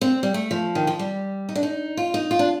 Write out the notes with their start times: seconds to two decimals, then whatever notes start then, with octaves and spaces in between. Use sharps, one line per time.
0.01 C4
0.23 G3
0.34 A3
0.51 F3
0.75 D#3
0.87 F3
0.99 G3
1.49 D#4
1.56 D4
1.63 D#4
1.97 F4
2.14 D#4
2.31 F4
2.39 D4